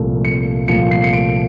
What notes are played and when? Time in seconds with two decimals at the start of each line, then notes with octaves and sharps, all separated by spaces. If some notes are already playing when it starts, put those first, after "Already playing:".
Already playing: C2 A#2 F3 A3
0.25 C#7
0.68 C2 A#2 F3 A3 C#7
0.91 C7
1.04 C#7
1.13 D7